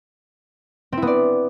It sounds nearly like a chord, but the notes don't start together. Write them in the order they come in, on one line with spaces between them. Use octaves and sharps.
C4 E4 B3 D5